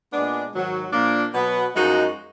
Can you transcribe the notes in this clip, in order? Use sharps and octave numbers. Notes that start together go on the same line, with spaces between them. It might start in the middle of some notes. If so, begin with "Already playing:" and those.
A#2 G#3 B3 D4
G#2 D#3 F#3
A#2 F3 A#3 D4
B2 F#3 B3
F#2 F3 G#3 D#4 F#4